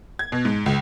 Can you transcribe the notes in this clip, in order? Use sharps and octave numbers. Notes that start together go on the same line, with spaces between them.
G#6
B2
G#2
C#2